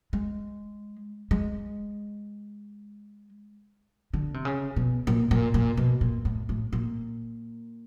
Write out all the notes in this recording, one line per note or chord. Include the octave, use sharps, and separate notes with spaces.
G#3
G#3
D3
C3
C#3
B2
A#2
A#2
A#2
B2
A#2
A2
A2
A#2